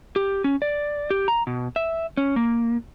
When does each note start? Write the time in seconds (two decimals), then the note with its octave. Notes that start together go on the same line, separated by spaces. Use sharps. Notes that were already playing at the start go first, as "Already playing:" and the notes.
0.16 G4
0.44 C#4
0.62 D5
1.10 G4
1.28 A#5
1.47 B2
1.76 E5
2.17 C#4
2.36 A#3